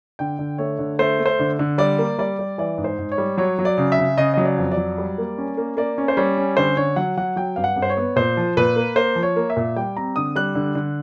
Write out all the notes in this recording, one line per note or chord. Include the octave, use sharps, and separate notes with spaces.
D3 G5
D3
A3 C#5
D3
A3 C5
A3
C5
D3
D3
G3 D5
A#3
G3 D5
G3
E3 D5
G#2
C5
G#2
C#5
G3
F#3 C#5
F#3
D5
C#3
E5
C#3
C#3 D#5
F#3 D#5
D5
F2
D5
F#3
G3
A#3
C#4
A#3
A#3 D5
C#4
C5
G3 C#5
C#4
D3 C5
D3 C#5
F#3 F#5
F#3 F#5
F#3 G5
G2 F5
F#5
G2
C5
C#5
B3
A#2 C5
F3
A#2 B4
A#3
A#3 C5
F3
C#5
A#3
E5
A#2
G3 G5
C4 A#5
D3 D#6
G3 F#6
D3
D3